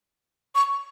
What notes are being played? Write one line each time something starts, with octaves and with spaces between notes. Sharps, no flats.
C#6